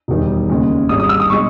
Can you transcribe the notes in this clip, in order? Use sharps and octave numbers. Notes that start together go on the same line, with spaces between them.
E1 E2 D#3 G3
D#2 C#3 G#3
G#1 G#2 G3 D#6
D#6
E6
D#6
B2 G#3 C#6